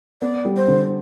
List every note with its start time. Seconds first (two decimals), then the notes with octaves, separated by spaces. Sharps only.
0.22 B3 D5
0.45 G3
0.57 C5
0.68 D3